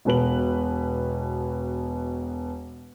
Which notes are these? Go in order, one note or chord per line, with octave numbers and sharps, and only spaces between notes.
E1 B2 B4 F#7